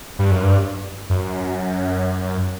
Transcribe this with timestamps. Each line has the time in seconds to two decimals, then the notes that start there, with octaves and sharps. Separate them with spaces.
0.19 G2
0.31 F#2
0.43 G2
1.10 F#2